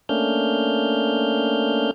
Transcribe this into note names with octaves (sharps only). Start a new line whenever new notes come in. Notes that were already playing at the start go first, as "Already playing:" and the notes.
A3 A#3 C#4 D4 F6 G6